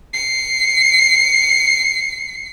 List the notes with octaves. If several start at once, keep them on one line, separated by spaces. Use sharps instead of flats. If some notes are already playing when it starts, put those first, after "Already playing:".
C7 C#7